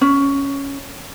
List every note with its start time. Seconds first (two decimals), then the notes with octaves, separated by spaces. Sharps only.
0.01 C#4